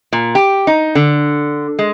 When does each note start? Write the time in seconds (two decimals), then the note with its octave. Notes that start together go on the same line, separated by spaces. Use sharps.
0.13 A#2
0.35 G4
0.67 D#4
0.95 D3
1.79 G#3